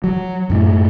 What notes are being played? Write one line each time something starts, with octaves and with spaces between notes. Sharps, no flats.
F#3
F#2 A2 A3